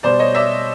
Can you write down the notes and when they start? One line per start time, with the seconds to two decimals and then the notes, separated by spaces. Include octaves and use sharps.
0.03 B2 G3 C5 D5
0.19 C#5 D#5
0.35 D5 E5